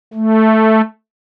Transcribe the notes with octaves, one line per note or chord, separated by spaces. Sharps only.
A3